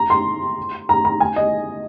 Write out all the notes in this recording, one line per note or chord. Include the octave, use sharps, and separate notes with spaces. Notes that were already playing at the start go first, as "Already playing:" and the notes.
Already playing: A#5
C6
A#5
A#5
G#5
D#5